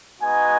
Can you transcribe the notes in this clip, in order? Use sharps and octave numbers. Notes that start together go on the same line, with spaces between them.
G#3 B3 D#4 F#4 G#5